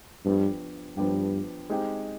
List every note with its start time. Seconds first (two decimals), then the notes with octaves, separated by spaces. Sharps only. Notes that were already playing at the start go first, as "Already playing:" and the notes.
0.25 G2 F3 B3 D4 G4
0.97 G2 F3 B3 D4 G4
1.70 G#3 C4 D#4 G4